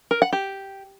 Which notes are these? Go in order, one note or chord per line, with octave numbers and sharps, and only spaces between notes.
A#4
F#5
G4